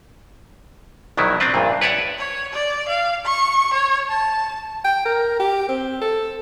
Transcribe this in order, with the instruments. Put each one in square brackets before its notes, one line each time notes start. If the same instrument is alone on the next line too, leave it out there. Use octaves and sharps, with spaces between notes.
[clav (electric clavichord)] A#1 B2 D#3 F#3 E4
C4 D4 B4
A#1 G2 A#2
B4 C#5 D5 E5 F#5
[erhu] C#5
D5
F5
C#6
C#5
A5
[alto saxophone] G5
A#4
G4
C4
A4